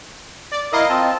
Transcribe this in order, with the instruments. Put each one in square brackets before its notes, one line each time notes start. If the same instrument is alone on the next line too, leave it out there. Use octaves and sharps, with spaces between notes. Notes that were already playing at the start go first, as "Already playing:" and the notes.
[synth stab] D5
[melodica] E4 A#4 F5 [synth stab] D#5
[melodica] C4 F4 A5